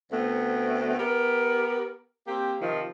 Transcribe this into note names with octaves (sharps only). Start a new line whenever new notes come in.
D2 A3 B3 C4
B3 G4 A#4
A#3 C4 G4
C3 D#3 F3